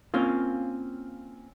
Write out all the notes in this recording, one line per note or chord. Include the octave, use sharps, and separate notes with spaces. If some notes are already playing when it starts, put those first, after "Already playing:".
A#3 C4 C#4 F4